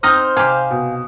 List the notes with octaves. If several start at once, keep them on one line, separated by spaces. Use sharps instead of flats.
C4 D#4 C5 D#5 F6 G6
C3 G4 F5 G#5
B2